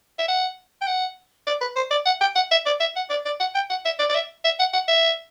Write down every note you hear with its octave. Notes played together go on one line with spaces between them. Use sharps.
E5
F#5
G5
F#5
D5
B4
C5
D5
F#5
G5
F#5
E5
D5
E5
F#5
D5
D5
F#5
G5
F#5
E5
D5
D5
E5
E5
F#5
F#5
E5